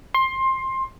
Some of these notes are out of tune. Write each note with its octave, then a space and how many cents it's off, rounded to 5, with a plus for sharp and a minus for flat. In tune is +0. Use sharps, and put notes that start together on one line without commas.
C6 +20